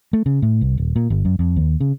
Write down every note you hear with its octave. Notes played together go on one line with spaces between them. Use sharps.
A3
C#3
A2
C2
D#1
A#2
G1
F#2
F2
D#2
C#3